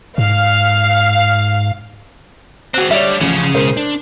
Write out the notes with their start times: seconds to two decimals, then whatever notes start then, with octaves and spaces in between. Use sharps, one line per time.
0.18 G#2 F5
2.74 C4 F#4 G#4 F#6
2.91 G3 A4 C#5 D5 E5
3.21 A1 C#3 F3 G#4
3.54 B2 G#3 A#4 C5
3.77 D4